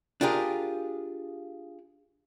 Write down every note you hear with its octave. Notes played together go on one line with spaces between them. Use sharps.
D4 F4 G4 G#4 A#4